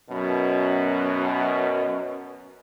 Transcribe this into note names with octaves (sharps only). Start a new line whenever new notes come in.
F#2 B2